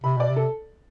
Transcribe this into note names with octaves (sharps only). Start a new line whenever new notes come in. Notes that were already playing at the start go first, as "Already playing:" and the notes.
C3 B5
B2 D5
C3
A4